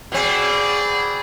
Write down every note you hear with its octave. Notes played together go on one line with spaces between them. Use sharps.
B2 C4 G#4 D5